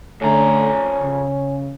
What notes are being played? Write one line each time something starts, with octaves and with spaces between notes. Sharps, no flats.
F2 D3 A3 C#4 A#5
C#3